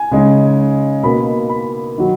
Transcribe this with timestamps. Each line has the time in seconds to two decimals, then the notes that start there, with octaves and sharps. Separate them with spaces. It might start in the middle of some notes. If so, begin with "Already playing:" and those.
Already playing: G#5
0.11 C#3 G#3 D#4
1.03 B2 A#3 D#4 B5
1.49 B5
1.98 D#3 F#3